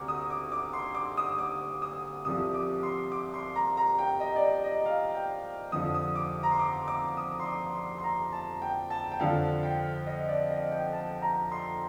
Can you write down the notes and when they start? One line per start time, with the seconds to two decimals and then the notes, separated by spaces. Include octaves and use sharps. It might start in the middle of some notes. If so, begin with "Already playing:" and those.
Already playing: D2 C3 A#5 D6
0.08 D#6
0.30 D6
0.52 D6
0.73 C6
0.95 D6
1.17 D#6
1.38 D6
1.82 D#6
2.25 C2 C3 F3 D#6
2.54 D6
2.83 C6
3.12 D6
3.34 C6
3.56 A#5
3.77 A#5
3.99 G5
4.20 D#5
4.36 D5
4.42 D#5
4.64 D#5
4.86 F5
5.15 G5
5.72 F2 D3 F3 D#6
5.94 D#6
6.16 D6
6.43 A#5
6.51 C6
6.59 D6
6.88 D6
7.17 D#6
7.40 C6
7.46 D6
7.75 C6
7.98 C6
8.04 A#5
8.32 A5
8.62 G5
8.90 A5
9.12 G5
9.20 F2 D3 F3 F5
9.63 G5
10.06 D#5
10.28 D5
10.50 D#5
10.72 G5
10.93 A5
11.22 A#5
11.52 C6